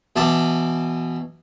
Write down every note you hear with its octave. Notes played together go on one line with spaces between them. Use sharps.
B2 E3 A5 D6